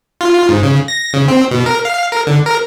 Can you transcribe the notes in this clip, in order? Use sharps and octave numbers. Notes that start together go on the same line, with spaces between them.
F4
G#2
C#3
A#6
C#3
C4
B2
A#4
F5
A#4
D3
A#4